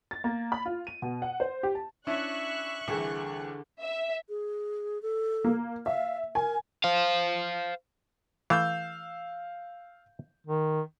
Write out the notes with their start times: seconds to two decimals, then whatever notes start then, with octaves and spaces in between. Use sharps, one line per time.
0.11 A6
0.24 A#3
0.52 B5
0.66 F4
0.87 D#7
1.02 B2
1.22 F#5
1.40 C5
1.63 G4
1.75 A5
2.07 C#4 D4 E4 E5 C#6 F#6
2.88 C2 D3 E3 G#4 A#4
3.81 E5
4.29 G#4
5.02 A4
5.44 A#3
5.86 E5 F5
6.35 A#4 G#5
6.84 C5 F5
8.50 E3 A3 F5 E6 G6
10.46 D#3